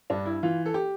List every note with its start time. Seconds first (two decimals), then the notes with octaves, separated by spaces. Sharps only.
0.10 G2 D4
0.26 E4
0.43 E3 F4
0.66 A4
0.74 G4